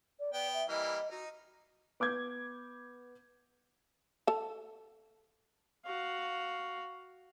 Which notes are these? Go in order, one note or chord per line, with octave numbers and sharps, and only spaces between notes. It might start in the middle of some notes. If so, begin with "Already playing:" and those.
D5
B3 D5 G5
E5
E3 G3 A#3 D#5
D#4 F#4
B3 D6 G6 G#6
A4 A5
F#4 F5